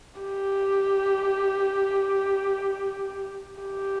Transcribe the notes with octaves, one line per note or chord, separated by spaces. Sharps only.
G4
G4